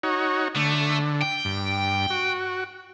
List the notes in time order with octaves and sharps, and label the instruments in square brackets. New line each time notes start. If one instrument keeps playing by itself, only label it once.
[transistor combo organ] D#4 F#4 C#5
[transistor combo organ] D3 [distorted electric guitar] A3
[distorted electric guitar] G5
[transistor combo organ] G2
F#4